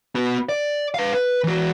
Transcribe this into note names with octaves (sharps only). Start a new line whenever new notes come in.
B3 F#4
D5
B4 F5
B4
E3 F#4